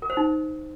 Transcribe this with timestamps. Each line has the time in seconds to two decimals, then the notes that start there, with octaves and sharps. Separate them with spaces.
0.02 A#4
0.10 C5
0.17 D#4